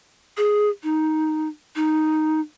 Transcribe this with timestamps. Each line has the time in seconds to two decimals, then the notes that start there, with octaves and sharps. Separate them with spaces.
0.37 G#4
0.83 D#4
1.76 D#4